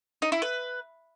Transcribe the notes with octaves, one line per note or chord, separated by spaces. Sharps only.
D#4
E4
B4